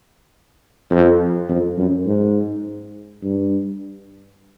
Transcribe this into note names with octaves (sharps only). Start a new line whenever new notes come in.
F2
F2
F#2
G#2
G2